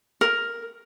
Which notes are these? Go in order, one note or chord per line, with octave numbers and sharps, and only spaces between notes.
A#4